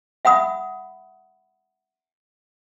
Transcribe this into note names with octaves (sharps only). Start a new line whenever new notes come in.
E5 F#5 B5 D#6